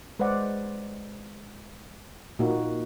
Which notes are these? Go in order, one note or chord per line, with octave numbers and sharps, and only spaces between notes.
G#3 B4 C5 D5 F#5
A#2 A#3 D#4 F#4